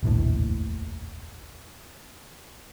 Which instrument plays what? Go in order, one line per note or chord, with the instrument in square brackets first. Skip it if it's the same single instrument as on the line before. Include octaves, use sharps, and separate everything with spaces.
[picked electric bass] F1 A#1 D#2 A2